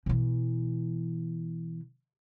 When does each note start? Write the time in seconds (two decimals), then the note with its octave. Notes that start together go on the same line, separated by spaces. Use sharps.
0.06 B2 E3